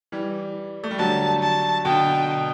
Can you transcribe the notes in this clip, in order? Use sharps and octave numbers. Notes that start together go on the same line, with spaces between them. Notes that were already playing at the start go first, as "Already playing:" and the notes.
E3 G3
A3
G3
D3 F#3 A5
A5
B2 D3 G5